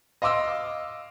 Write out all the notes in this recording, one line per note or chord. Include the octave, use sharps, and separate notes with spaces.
D#5 F5 C6 D6 E6